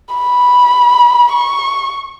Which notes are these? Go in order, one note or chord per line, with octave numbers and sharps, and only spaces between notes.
B5
C#6